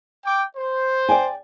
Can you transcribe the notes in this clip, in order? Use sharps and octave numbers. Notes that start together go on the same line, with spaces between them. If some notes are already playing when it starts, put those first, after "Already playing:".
G5 D6
C5
D5 G5 G#5